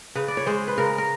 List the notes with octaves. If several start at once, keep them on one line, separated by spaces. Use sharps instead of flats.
C#3 B4
D5
C#5
G#3 C5
B4
C#3 A#4
A#4